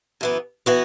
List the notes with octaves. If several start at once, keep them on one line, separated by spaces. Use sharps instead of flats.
F#2 E3 B3
E3 B3 F#4